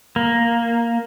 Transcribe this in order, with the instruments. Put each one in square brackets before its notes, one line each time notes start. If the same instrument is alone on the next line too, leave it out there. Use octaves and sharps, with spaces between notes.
[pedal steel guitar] A#3